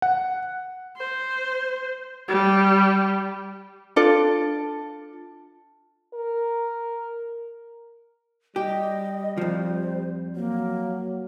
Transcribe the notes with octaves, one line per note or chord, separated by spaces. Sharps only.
F#5
C5
G3
D4 F4 A4 D5
A#4
G3 G4 D#5
F2 F3 C5
F#3 A#3